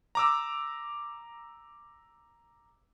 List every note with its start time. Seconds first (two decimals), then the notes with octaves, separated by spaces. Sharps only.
0.15 A#5 D6 E6